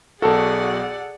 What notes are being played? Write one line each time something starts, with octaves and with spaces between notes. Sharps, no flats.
B1 F#4 G#4 A4 D5 F#5